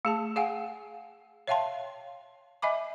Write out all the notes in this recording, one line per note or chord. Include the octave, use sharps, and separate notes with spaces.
A3 G#4 A5
G#4 F5 F#5 G#5
C#5 E5 F5 G5 A5 C6
D#5 E5 G#5 B5 D6